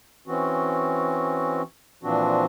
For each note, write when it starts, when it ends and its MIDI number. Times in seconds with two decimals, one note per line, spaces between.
0.28 1.62 52
0.28 1.62 60
0.28 1.62 61
0.28 1.62 66
2.03 2.45 46
2.03 2.45 52
2.03 2.45 53
2.03 2.45 60
2.03 2.45 62
2.03 2.45 66